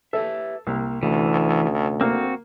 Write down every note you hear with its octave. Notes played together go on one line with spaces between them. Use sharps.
G4 A4 B4 E5
C2 A#3
D2 C3 E3 A3 C#4
A#3 C4 F#4